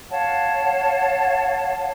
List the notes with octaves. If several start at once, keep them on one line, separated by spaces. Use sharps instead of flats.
C#5 F5 F#5 A5